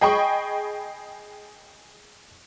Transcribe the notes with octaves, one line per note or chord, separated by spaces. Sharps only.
G#4 D#5 G5 B5 C#6